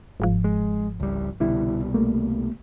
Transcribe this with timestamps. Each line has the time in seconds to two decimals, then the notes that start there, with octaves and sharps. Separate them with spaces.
0.20 G1 G#2 F3
0.44 G#3
1.00 C#2 G3
1.40 C2 B2 D3 G3 E4
1.94 A3 A#3